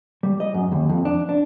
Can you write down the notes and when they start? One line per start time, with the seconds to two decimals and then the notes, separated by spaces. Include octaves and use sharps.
0.23 G3
0.40 D#5
0.54 F#2
0.72 D#2
0.89 F2
1.05 D4
1.29 D4